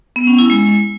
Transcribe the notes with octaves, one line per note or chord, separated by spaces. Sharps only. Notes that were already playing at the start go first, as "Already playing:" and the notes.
B3
C#4
E4
G#3